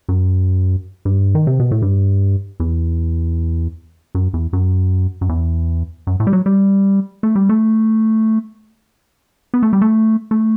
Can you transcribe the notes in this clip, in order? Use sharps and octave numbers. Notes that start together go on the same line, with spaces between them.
F#2
G2
D#3
C3
B2
A2
G2
E2
F#2
E2
F#2
F#2
E2
F#2
A2
G3
F#3
G3
A3
G3
A3
B3
A3
G3
A3
A3